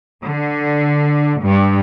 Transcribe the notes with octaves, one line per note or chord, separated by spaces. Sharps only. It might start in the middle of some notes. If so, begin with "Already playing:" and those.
D3
G2